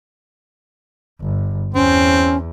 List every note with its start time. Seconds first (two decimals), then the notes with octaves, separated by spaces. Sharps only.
1.21 G1
1.74 E2 C4 C#4